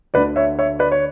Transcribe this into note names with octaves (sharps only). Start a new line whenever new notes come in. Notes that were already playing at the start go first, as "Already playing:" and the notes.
D2 D3 B4 D5
C#5 E5
C#5 E5
B4 D5
C#5